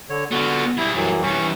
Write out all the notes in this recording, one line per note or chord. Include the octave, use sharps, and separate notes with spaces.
D3 C#5
D3 B3 F4 F#4
G2 E4 G#4
F#2 E3 F#3
G2 E3 C#4 C#6